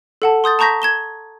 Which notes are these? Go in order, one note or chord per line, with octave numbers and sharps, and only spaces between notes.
A4 F#5 A5
C6 D#6 G6 A6
A5 A#5 C#6 G6 A#6 B6
G#6 E7 G7